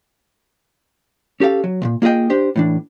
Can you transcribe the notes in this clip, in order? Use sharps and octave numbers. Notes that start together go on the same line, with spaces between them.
C#4 G4 A4 F5
F#3
C#2 A#2
A#3 F4 G#4 D#5 G5
D4 G4 C5
A2 E3 D4